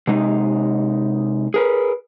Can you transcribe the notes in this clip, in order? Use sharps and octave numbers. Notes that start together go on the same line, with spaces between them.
C3 G#3 D#4
G#4 A#4 B4